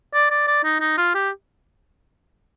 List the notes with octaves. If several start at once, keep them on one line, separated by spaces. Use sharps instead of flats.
D5
D5
D5
D#4
D#4
F4
G4